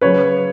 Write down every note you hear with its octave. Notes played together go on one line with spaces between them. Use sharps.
C#3 F#3 B4 C#5